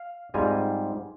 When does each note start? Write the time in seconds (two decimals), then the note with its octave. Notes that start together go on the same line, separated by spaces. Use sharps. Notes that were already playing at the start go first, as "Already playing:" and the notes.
Already playing: F5
0.34 G#2 G3 C4 F4 G#5